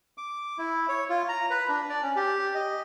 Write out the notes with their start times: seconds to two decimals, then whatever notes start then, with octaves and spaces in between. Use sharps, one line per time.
0.18 D6
0.58 E4
0.89 C#5
1.09 F4
1.29 A#5
1.50 B4
1.69 D4
1.90 D5
2.03 C#4
2.16 G4
2.54 D#5